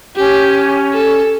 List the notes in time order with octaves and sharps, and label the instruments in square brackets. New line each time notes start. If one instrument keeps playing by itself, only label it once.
[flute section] C#4 [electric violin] G4
[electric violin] A4